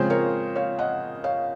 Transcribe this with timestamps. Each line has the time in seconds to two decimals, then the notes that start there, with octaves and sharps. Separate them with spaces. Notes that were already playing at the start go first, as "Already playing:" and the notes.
Already playing: C#3 F3 G#3 C4 G#4 C5
0.10 A#4 C#5
0.55 C#5 F5
0.79 D#5 F#5
1.24 C#5 F5